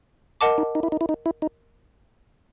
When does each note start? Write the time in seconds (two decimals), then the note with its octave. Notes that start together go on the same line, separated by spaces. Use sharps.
0.41 A#4 D#5 F#5 A5 D6
0.58 D#4
0.75 D#4
0.83 E4
0.92 D#4
1.01 E4
1.09 D#4
1.26 E4
1.42 D#4